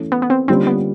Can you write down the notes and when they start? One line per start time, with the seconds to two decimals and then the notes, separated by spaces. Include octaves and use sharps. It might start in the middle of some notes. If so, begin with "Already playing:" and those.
Already playing: E3 A3 C#4
0.12 B3
0.22 B3
0.30 C4
0.48 D3 G3 A#3 C4 C#4 F4
0.67 B3